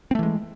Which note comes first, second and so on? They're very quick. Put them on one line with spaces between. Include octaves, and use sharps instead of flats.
C4 A3 E3 G#3